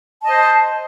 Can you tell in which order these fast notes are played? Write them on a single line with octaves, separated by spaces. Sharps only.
A5 D#5 C5